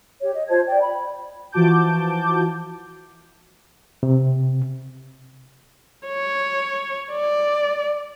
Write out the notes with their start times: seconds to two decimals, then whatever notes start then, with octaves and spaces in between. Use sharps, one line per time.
0.21 G4 C#5
0.35 D#5
0.49 F4 C5 A5 G#6
0.67 D5 G5
0.80 B5
1.52 E3 F3 F#4 A5 D6 G6
4.03 C3
6.08 C#5
7.12 D5